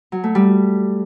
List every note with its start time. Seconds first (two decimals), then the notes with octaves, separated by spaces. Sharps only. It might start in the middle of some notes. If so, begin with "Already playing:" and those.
0.12 F#3
0.24 A3
0.35 G3